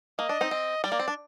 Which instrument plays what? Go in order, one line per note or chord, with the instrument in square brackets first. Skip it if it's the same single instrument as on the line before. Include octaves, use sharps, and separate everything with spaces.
[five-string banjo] A#3 [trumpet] D#5
[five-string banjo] D4
C4 D#4
C4
[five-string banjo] G3 [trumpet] D5
[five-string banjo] A#3
C4
D4